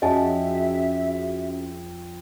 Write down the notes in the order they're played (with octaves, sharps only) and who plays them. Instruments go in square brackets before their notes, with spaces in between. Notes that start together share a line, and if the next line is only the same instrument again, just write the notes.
[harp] F2 [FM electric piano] C#4 F#4 G#4 [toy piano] D#5 G#5 A5 [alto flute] E5